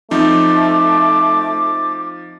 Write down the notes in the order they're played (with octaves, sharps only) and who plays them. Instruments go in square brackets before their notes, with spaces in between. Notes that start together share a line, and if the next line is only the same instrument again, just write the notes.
[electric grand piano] F3 C4 D#4 [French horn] A3 [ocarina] D6